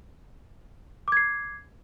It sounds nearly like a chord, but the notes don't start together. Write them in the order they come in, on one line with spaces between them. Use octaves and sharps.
D6 G#6 C7